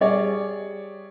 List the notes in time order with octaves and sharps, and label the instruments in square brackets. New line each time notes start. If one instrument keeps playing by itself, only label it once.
[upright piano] G3 G#4 C#5 D5